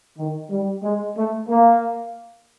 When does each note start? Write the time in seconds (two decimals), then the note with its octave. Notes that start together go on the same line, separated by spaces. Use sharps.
0.17 D#3
0.51 G3
0.83 G#3
1.17 A3
1.48 A#3